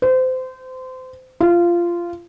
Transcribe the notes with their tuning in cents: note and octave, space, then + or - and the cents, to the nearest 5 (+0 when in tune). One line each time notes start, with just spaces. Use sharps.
C5 -25
F4 -15